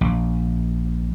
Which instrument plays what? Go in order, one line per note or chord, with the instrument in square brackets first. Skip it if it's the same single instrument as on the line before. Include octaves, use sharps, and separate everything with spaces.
[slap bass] A#1